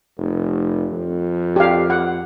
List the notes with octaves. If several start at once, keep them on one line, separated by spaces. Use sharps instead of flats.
F1
F2
G4 F5
F#5